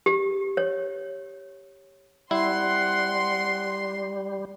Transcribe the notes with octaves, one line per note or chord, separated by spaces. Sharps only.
G4
C#5
G3 C4 E4 F#5 C6